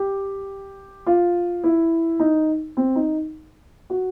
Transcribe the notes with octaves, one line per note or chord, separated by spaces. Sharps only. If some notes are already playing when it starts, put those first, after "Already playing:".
Already playing: G4
F4
E4
D#4
C4
D#4
F#4